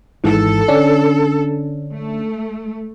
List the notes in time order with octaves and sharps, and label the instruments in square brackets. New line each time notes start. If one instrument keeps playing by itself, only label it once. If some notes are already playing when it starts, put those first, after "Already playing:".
[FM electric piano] G#1 G#2 E3 [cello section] A4
[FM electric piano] D3 C#4 D4
[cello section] A3